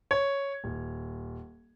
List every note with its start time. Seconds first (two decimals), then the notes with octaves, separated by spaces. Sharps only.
0.11 C#5
0.64 D#1